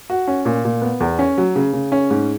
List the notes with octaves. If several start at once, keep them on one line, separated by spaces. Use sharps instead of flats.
F#4
C#4
A#2
A#2
B3
E2
C#4
F#3
C#3
C#3
C#4
G#2